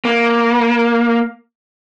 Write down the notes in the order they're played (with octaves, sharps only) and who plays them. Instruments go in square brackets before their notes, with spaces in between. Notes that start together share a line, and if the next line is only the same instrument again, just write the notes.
[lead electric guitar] A#3